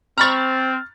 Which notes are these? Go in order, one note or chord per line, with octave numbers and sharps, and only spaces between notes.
C4 A#5 B5 C#6 F6 A6